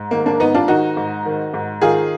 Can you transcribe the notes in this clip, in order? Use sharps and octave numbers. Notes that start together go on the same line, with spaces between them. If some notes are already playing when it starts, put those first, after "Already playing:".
Already playing: G#2
D#3 A#3
A#3 D4
G#2 B3 D#4
D4 F4
D#3 D#4 F#4
G#2
D#3
G#2
D#3 F4 G#4